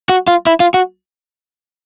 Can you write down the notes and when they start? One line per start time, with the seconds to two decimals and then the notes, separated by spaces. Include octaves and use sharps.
0.09 F#4
0.27 F4
0.47 E4
0.60 F4
0.74 F#4